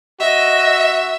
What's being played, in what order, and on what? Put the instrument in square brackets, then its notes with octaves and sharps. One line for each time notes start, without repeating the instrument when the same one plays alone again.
[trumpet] F#4 [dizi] D#5 [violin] E5